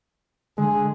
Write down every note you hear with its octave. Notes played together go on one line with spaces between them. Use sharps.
D3 G#3 G#4